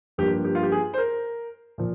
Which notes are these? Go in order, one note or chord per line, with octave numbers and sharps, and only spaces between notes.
G2 F3 A#3 G4
G4
F4
G4
G#4
C5
A#4
A#2 F3